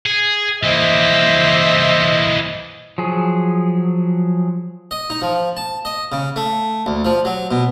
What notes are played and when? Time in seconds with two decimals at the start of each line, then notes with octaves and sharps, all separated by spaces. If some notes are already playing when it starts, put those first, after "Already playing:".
0.06 G#4
0.63 E3 A#3 C5 D#5 E5
2.98 F3 F#3 G#4
4.91 D#5
5.10 D#4
5.22 F3
5.57 A5
5.85 D#5
6.12 C#3
6.36 A3
6.86 D2
7.05 F3
7.25 F#3
7.51 B2